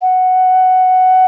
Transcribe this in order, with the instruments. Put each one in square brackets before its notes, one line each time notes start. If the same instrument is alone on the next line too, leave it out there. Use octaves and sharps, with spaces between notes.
[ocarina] F#5